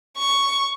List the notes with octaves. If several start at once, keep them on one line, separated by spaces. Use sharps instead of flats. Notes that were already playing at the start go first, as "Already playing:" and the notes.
C#6